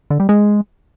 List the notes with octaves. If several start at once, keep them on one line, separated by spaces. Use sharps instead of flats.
D3
G3
G#3